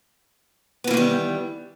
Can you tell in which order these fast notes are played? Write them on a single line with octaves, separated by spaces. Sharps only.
B3 E3 A#3 D#3 G3